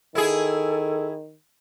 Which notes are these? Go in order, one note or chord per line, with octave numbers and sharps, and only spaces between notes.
D#3 E4 G#4 A4